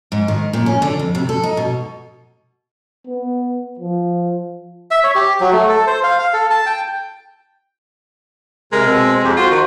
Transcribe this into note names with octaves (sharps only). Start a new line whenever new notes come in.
G#2
D#3
A#2
C#4
D3
F2
C3
A4
D#4
B2
B3
F3
E5
C#5
G4
F#3
A3
A4
C5
F5
F5
A4
A5
G5
C3 G#3 A#4 A#5
B2 C4
F2 G4 C5
F4 F#4 C5
D#3